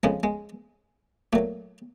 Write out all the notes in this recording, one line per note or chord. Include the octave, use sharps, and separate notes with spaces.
F2 C#3 F3 G#3
G#3
A#2 F#3 A3